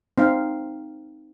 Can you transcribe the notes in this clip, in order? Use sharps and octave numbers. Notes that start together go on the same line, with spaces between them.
C4 D#4 F5